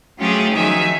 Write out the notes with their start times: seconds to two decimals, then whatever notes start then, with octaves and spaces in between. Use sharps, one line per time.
0.19 F#3 A3 C#4 F4 G4 G#4
0.51 D#3 F3 F#3 D#4 E5 G#5